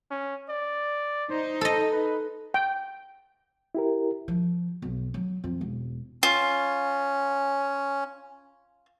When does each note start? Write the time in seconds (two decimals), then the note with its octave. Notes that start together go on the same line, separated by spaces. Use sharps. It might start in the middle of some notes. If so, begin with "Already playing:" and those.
0.11 C#4
0.49 D5
1.31 D#4 C5
1.61 A4 D#5
1.92 B4
2.54 G5
3.75 E4 G4 A#4
4.28 F3
4.82 B1
5.14 F#3
5.44 F2
5.61 E1
6.23 C#4 F4